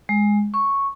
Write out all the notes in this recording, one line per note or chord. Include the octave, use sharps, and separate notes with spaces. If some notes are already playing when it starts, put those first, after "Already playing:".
G#3
C#6